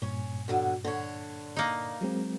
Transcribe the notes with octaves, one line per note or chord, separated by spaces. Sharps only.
G2 A#2 C#4 C#5
B2 D3 F#3
D3 C#5
A#3 D#4
F#3 G#3 C4